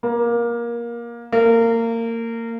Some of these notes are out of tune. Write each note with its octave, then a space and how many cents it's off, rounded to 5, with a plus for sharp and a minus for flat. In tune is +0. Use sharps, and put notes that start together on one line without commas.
A#3 +20
A#3 -25